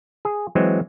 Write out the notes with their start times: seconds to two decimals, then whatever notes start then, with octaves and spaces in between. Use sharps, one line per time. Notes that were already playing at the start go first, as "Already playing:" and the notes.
0.25 G#4
0.55 E3 F#3 G#3 C4